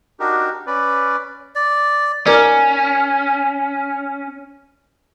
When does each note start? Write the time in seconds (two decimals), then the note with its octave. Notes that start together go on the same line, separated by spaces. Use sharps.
0.20 D4 D#4 F#4 G4 A#4
0.67 C#4 B4 D5
1.55 D5
2.26 C#4 A#4 D5